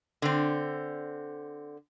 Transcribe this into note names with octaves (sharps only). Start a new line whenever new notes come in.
D3 C4